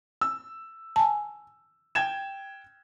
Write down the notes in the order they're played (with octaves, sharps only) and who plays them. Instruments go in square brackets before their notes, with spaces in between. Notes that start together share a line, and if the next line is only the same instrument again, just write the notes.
[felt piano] E6
[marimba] G#5 A5
[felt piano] G5 G#6 E7